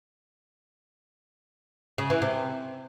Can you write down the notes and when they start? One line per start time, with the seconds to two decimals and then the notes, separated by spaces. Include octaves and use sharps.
1.98 C#3
2.10 E3
2.22 C3